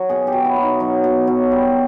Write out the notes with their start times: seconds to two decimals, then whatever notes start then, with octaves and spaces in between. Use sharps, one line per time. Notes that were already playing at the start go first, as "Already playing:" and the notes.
Already playing: F#3
0.09 B2 G#4
0.27 G4
0.33 F#3
0.45 E4
0.56 B2
0.62 D#4
0.80 F#3
1.04 B2
1.27 F#3
1.52 G3